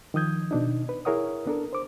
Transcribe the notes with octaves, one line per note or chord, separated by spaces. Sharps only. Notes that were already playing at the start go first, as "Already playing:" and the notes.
D#3 F3 D#6 G6 G#6
B2 D4 D#4
B4
E4 G#4 A#4 C#5 F#5 D#6
B3 D4 A4 A#4
C5 D6